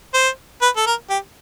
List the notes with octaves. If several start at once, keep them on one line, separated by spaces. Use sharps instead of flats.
C5
B4
A4
A#4
G4